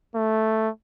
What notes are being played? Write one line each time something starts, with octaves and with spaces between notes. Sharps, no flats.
A3